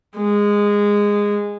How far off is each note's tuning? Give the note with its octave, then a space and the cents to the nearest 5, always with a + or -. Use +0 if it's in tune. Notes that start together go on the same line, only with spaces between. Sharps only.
G#3 -15